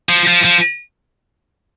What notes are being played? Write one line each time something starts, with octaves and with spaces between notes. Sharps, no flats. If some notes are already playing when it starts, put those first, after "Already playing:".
F3
F3
F3